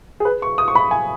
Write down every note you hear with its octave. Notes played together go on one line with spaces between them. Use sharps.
G#4
B4
C#6
D#6
C#6
B5
G#5